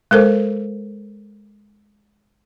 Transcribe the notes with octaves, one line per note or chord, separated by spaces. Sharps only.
G#3 A4 A#4 C5